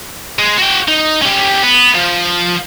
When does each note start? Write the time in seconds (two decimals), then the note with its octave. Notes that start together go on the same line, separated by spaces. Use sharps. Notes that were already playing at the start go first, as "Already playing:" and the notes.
0.39 G#3
0.58 F#4 G5
0.88 D#4
1.22 C#4 G4
1.63 B3
1.95 F3